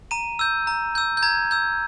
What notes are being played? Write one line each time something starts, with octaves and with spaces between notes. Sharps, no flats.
A#5 D#7
E6 G6
A#5
E6 G6
G6
A#5 G#6
E6 G6